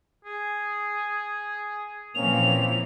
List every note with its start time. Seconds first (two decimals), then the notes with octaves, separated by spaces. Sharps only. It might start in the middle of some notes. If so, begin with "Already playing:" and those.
0.25 G#4
2.15 A#2 E3 F3 A#3 C4 C#4 F7